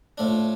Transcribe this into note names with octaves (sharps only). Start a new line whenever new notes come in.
A2 F3 A3 D4